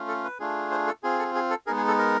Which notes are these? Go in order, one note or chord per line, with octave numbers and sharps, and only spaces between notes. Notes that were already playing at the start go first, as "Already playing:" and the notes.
Already playing: A3 C#4 F4
A4
B4
A3 D4 F4 G#4
C5
A4
C4 F4 G#4
A4
G#4
A4
G#3 B3 D#4 G#4 A#4
G#4
A4
A#4